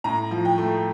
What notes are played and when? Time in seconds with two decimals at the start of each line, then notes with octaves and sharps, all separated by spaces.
0.04 A2 A#5
0.31 F3
0.45 G5
0.58 A3